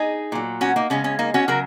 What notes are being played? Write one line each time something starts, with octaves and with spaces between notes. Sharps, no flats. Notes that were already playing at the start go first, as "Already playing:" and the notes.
Already playing: D#4 G#4
A#2 F#3
C#4 F#4
A#3 D#4
C#3 G#3 C#4
C#4
A#3 D#4
C#4 F#4
C#3 F#3 F#4 A#4